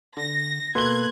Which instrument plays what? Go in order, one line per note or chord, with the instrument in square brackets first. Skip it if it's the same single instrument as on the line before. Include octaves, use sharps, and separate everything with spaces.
[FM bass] D3 [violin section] A#6
[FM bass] B2 [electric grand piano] A#3 A4 B4 [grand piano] C6 G7 [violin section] F#6 G#6